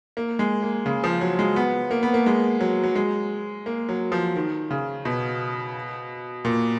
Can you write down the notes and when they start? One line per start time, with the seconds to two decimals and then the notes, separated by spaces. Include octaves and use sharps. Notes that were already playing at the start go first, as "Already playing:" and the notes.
0.17 A#3
0.39 G#3
0.63 A#3
0.86 C#3
1.04 F3
1.21 F#3
1.39 G#3
1.56 B3
1.91 A#3
2.03 B3
2.14 A#3
2.26 G#3
2.60 F#3
2.83 F#3
2.95 G#3
3.66 A#3
3.89 F#3
4.12 F3
4.36 D#3
4.71 C#3
5.05 B2
6.45 A#2